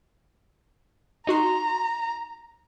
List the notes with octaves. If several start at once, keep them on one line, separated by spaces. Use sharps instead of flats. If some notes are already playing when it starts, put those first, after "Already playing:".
D#4 F#4 A#5 C6